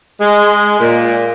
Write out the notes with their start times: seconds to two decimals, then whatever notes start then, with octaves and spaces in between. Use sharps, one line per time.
0.20 G#3
0.80 A#2